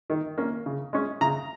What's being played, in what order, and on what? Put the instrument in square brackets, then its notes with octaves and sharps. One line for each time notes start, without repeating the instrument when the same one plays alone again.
[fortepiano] D#3
A#3 C#4
C#3
G#3 C#4
C#3 A#5